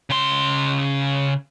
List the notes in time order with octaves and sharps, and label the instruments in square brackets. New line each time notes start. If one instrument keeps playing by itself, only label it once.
[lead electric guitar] C#3 C6